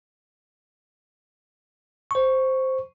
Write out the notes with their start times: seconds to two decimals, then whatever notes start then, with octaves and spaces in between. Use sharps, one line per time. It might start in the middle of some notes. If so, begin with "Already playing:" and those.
2.11 C5 C#6